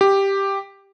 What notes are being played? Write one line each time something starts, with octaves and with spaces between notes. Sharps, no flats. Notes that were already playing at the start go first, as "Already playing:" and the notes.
G4